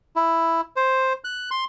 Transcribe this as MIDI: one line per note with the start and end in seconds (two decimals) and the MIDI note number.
0.16 0.61 64
0.76 1.13 72
1.24 1.50 90
1.51 1.65 84